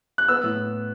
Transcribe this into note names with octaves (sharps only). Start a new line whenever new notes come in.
F#6
B3 E6
A2